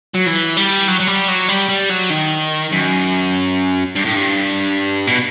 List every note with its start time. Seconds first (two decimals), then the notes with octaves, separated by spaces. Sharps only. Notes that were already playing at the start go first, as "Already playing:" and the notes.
0.14 F#3
0.26 E3
0.57 G3
0.88 F#3
1.00 F#3
1.07 G3
1.28 F#3
1.49 G3
1.69 G3
1.90 F#3
2.10 D#3
2.72 F#2
3.95 G2
4.05 A2
4.15 G2
5.08 B2